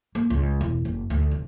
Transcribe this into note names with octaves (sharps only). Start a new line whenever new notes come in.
A#3
C#2
E1
F#1
D2
F1